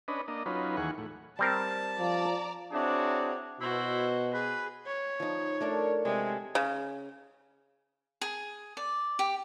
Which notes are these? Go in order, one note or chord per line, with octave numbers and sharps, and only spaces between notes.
C#4 D4 B4 D#5
A#3 D4 D#5
F#3 C#4 D#4 F4 B4
D#2 E3 G#4 F#5 C#6
A2
G3 C4 A#4 A5
F3 D5 A#5
F#3 C4 D4 E4 F#4 G#4
B2 E4 F#4 C5
G#4 B4
C#5
F3 D#4
A3 D4 A#4
C3 G#3
C#3
G#4
D5
G4